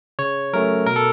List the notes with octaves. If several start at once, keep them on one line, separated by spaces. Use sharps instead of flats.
C#3 C#5
F#3 A3 C#4 A#4
B2 A#4
A4